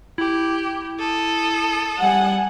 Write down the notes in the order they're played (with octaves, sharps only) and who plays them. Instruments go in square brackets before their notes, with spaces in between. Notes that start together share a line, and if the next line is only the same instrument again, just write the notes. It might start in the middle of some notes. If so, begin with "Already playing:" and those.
[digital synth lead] E4 [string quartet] G4
[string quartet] A4 D#6
[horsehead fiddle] G3 G#5 [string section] F#5